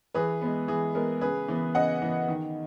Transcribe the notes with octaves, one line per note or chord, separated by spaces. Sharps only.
E3 G#4 B4
G#3 B3
E3 G#4
G#3 B3 A#4
C#3 G#4 B4
E3 B3
C#3 D#5 F#5
E3 B3
D#3